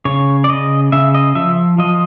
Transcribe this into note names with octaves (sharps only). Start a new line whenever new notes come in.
C#3 C#5
D5
C#3 D#5
C#3 E5
D#5
F3 E5
F3 D#5